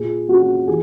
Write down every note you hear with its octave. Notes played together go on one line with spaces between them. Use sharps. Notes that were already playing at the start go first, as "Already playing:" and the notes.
Already playing: A#2 G#4
A#3 C#4 F#4
E3 G#4